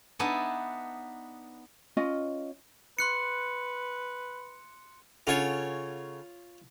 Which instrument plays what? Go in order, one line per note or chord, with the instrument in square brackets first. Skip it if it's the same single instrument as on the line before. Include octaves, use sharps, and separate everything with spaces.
[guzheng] B3 D4 D#4 E5 G#5 A5
[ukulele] C#4 F4 D#5
[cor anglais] B4 [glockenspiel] C6 F#6 C#7
[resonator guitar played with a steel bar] C#3 A4 F#5 [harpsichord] F4 C#5